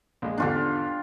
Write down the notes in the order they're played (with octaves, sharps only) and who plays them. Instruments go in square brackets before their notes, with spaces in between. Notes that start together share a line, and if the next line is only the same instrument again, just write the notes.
[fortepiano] A#1 G#3
[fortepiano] E2 G#2 D3 [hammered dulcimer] D4 F4 G4